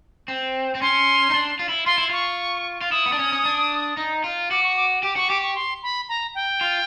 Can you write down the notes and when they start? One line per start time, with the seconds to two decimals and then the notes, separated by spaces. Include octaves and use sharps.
0.28 C4
0.75 C4
0.81 C#4 C6
1.30 D#4
1.34 D4
1.59 F4
1.69 E4
1.86 F4 C6
1.98 E4
2.10 F4 C#6
2.81 F4
2.91 E4 D#6
3.06 B3
3.12 D4
3.19 C#4
3.32 C#4
3.45 D4
3.97 D#4
4.24 F4
4.51 F#4 D6
4.64 C#6
4.76 D6
5.03 G4 D6
5.16 F#4 C#6
5.29 G4 D6
5.42 C#6
5.55 C6
5.83 B5
6.09 A#5
6.35 G5
6.61 F4